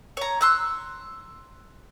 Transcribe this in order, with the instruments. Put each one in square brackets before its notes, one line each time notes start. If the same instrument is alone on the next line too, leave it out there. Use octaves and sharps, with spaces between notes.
[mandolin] C#5 A#5
C6 E6 F#6